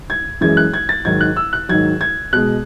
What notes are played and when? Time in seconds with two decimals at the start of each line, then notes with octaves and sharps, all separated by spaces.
0.10 G#6
0.41 F#2 E3 G#3 G#6
0.57 F#6
0.74 G#6
0.89 A6
1.05 G#2 D#3 F#3 G#6
1.21 F#6
1.36 E6
1.53 F#6
1.69 G#2 D#3 F#3 G#6
2.01 G#6
2.33 B2 G#3 F#6